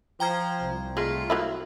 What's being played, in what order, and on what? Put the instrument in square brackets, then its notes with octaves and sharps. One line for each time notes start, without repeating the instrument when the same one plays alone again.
[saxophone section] F3 [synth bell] G5 A#5 G#6
[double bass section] C2 C3 C4
[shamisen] G#3 [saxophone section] A3 F4
[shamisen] F#3 A#3 E4